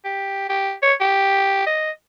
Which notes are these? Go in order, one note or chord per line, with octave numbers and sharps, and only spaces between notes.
G4
G4
C#5
G4
D#5